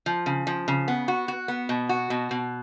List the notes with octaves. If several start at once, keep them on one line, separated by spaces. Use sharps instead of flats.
F3
C#3
F3
C#3
B3
F#4
F#4
B3
B2
F#4
B2
B2